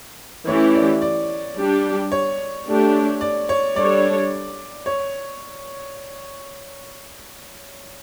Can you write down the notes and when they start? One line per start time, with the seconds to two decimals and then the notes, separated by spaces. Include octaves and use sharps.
0.47 E3 A3 C#4 E4 G4 C#5
0.74 D5
1.02 D5
1.57 G3 D4 G4
2.12 C#5
2.66 A3 D4 G4
3.21 D5
3.49 C#5
3.76 G3 D4 A4 C#5 D5
4.86 C#5